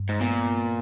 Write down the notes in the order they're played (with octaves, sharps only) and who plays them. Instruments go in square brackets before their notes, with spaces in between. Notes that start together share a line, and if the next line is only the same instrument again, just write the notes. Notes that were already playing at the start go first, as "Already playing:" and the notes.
Already playing: [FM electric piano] G2
[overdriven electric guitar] G#2
[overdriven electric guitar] A#2 [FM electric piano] B3